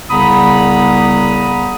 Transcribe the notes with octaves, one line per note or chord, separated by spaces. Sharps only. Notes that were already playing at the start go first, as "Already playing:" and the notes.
C2 C#3 B3 A#5 B5 D#6